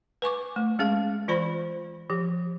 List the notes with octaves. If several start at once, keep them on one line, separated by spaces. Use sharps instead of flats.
B4 G#5 C#6 D6
A3
G#3 C#4 G#4 F5
E3 F4 C5 D5 B5
F3 G4